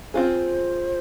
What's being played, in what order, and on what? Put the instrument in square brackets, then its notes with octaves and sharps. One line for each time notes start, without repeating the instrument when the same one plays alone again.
[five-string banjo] C4 F4 G#4 [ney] C5